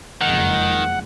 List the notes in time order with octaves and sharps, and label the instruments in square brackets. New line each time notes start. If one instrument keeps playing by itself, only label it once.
[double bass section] F#1 F2 G#3 [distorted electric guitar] D#3 [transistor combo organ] F#5